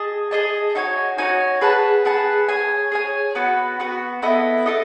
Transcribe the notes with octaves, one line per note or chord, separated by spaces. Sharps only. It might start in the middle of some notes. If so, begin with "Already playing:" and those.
Already playing: G#4 D#5 A5
G#4 D#5 A5
D#4 F#4 C#5 G#5
D#4 F#4 C#5 G#5
G#4 B4 F#5 A5
G#4 B4 F#5 A5
G#4 C#5 G#5
G#4 C#5 G#5
B3 F#4 B4
B3 F#4 B4
B3 E4 A4 D#5
E4 A4 D#5